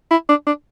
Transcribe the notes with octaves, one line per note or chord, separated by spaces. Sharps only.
E4
D4
D4